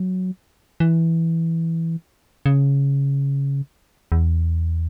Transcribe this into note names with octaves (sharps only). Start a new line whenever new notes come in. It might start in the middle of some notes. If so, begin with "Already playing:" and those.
Already playing: F#3
E3
C#3
E2